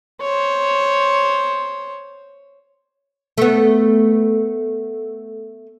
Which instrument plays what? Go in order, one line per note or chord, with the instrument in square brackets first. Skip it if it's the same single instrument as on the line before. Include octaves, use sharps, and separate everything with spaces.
[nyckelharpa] C5 C#5
[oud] A3 B3